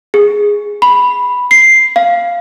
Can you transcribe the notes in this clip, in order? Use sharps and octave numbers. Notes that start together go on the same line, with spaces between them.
G#4
B5
C7
F5